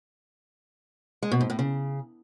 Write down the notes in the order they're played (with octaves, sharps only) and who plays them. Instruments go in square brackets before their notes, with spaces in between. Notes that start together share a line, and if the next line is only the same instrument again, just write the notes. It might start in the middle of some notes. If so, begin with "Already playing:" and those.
[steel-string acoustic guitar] G#3
B2
G#2
A2
C#3